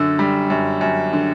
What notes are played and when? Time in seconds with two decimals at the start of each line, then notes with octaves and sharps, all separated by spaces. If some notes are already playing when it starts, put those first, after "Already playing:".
Already playing: F#2 D3 E6
0.19 G3
0.50 F#2
0.81 F#2
1.13 D3